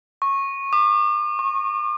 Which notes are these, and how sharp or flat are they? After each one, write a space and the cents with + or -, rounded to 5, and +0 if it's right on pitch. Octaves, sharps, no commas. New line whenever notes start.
C#6 -15
D6 +40
C#6 -30